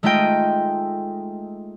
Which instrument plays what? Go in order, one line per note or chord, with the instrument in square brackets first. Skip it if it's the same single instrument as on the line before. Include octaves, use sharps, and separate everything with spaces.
[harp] G#3 A3 D#4 F4 D#5 G5